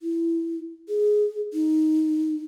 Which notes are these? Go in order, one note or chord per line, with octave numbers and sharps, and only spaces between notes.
E4
G#4
D#4